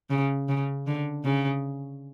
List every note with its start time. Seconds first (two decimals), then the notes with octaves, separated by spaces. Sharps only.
0.10 C#3
0.49 C#3
0.87 D3
1.24 C#3